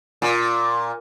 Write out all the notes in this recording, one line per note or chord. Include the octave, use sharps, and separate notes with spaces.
A#2